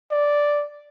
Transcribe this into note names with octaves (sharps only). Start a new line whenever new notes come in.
D5